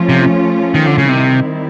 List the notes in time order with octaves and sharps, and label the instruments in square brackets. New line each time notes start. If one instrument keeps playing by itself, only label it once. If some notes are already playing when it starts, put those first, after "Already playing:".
Already playing: [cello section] F3 A3 C#4 F4
[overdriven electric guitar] C3
D#3
D3
C#3
[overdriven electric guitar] C3 [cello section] D#3 G3 C4 E4